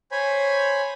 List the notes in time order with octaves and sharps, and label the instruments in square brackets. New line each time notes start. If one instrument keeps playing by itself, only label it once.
[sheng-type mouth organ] C5 C#5 G#5 B5